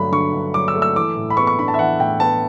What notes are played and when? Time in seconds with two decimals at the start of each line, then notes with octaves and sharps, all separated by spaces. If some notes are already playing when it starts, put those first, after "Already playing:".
Already playing: G2 D3 F#3 A3 B5
0.12 D3 C#6
0.34 G2
0.54 F#3 D6
0.68 E6
0.75 A3
0.82 E6
0.95 E3 D6
1.16 A2
1.30 B5
1.37 B3 C#6
1.47 C#6
1.59 D4 B5
1.68 A5
1.74 E5
1.79 E3 F#5
1.99 A2 G5
2.20 B3 A5